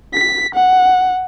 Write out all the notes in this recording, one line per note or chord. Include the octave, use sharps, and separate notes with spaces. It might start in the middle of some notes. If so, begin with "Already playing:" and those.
B6
F#5